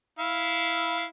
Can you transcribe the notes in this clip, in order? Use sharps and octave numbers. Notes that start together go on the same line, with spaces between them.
E4 F5